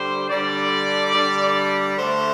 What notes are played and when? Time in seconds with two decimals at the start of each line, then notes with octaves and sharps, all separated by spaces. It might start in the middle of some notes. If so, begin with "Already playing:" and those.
Already playing: D3 G3 C5
0.29 D3 G3 D5
1.13 D3 G3
1.96 D3 A3 C5